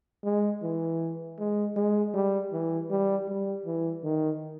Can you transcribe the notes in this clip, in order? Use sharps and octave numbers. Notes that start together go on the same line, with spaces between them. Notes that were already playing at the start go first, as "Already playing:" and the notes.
G#3
E3
G#3
G#3
G3
E3
G3
G3
E3
D#3